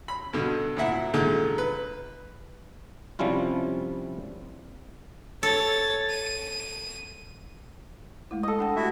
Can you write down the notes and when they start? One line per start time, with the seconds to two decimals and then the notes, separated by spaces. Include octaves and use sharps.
0.08 B5
0.33 G2 B2 D3
0.77 D2 A#2 E4 E5 F#5
1.14 A#2 D3 D#3 G#3
1.58 B4
3.19 C3 F3 G3 C#4 E4 F4
5.43 A4 C#5 A6
6.10 D#7
8.31 G#3 A3 E4
8.43 A4 D#5
8.59 D4 F#5 G5
8.76 A3 E4 F#4 G4 E5